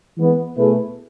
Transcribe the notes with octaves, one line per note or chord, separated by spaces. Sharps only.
E3 G#3 B3
B2 A3 E4 G#4 B4